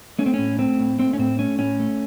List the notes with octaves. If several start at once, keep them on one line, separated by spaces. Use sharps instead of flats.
A3 C#4
C4
A2 C#4
A3 C4
A2
A3 C4
C#4
A2 C4
A3 C#4
A2 C#4
A3